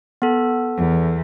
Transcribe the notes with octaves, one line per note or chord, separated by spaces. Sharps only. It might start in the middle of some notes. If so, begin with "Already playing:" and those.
B3 A4
E2